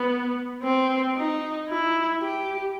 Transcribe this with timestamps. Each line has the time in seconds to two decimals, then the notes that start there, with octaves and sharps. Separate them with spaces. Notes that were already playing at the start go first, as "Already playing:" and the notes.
Already playing: B3
0.63 C4
1.16 D#4
1.69 E4
2.21 G4